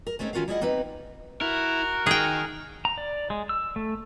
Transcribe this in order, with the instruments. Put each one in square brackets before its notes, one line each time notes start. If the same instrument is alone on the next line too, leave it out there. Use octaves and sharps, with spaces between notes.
[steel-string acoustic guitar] A#4
G#3 A3 C4 C#4 D#4
D#3 C#4 F4 F#4 A#4 F5
G3 E4 G#4 C#5 D#5 F#5
A#3 C4 D#4 B4
[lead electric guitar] E4 [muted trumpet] F#4 [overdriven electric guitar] A#4
[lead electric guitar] D#3 [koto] G#4 G5
[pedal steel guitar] A#5
D5
G#3
E6
A3